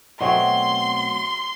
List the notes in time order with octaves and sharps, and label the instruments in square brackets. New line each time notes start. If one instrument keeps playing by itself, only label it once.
[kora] B2 F#3 A3 C4 [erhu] C6